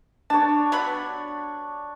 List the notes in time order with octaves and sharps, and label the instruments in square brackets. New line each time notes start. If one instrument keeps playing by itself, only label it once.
[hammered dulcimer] D4 C#5 [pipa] A5
[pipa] F#3 B3 B5